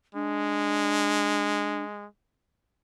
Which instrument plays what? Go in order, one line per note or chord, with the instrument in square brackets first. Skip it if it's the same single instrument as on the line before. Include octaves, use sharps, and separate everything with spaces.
[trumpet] G#3 [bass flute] D4